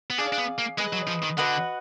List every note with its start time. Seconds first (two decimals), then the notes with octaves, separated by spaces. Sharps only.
0.10 B3
0.18 D4 G#4 D5 F5
0.33 D4
0.38 B3
0.58 A#3
0.78 G#3 G#4 B4 D#5
0.93 F#3
1.07 F3
1.23 D#3
1.37 D3 F#4 B4 D#5 F#5